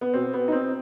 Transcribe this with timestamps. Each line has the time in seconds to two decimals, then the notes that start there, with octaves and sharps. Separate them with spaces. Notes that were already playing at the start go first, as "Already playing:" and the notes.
0.01 B3
0.13 B2 C4
0.33 B3
0.48 D#4
0.52 C4